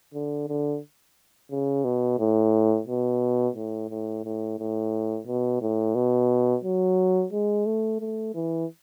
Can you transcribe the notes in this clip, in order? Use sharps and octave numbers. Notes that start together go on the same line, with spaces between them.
D3
D3
C#3
B2
A2
B2
A2
A2
A2
A2
B2
A2
B2
F#3
G#3
A3
A3
E3